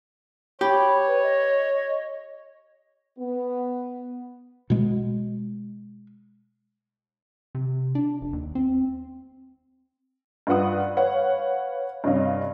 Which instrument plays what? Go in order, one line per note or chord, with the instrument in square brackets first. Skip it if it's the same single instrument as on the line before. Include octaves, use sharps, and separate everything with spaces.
[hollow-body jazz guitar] G4 [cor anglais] C#5 [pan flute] B5
[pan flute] B4
D#5
[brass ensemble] B3
[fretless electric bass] B2 G#3
[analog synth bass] C3
D4
F1
D#2
C4
[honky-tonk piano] G2 F4 B4 F#5 D#6
B4 C#5 F5 F#5
G2 C3 C#4 D#5 F5